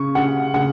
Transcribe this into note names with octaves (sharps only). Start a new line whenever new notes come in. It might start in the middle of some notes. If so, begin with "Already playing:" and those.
Already playing: C#3 C#6
C#3 F#5
C#3 F#5